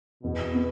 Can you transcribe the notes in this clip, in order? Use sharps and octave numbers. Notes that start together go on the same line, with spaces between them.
E2 B2
B3